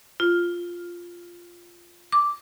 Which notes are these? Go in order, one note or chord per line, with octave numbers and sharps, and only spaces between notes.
F4
D6